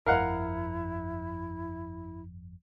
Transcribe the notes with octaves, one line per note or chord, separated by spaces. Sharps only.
G1 F2 E4 A#4 F5 F#5